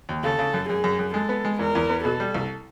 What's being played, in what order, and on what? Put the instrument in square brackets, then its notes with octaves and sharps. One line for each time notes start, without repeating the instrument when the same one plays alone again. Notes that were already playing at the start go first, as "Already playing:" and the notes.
[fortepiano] D#2
[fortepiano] C#3 [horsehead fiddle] A4
[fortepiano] C#3
F#2
[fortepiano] F#2 [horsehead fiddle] G#4
[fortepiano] F#2
F#2
[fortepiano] G#3 [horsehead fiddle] A4
[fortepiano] B3
G#3
[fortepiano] E2 [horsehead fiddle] A#4
[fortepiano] E2
B3
[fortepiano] B2 [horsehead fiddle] A4
[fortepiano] G3
C2